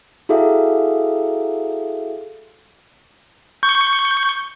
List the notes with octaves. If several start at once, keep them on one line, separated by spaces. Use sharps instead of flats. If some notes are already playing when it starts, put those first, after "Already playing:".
E4 F#4 G#4 A4 E5 F5
C#6 G6